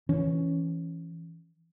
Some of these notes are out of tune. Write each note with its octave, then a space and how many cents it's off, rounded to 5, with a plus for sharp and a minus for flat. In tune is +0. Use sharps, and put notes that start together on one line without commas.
E3 +10 C#4 +0